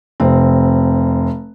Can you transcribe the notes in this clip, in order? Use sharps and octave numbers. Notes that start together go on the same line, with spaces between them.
F1 C4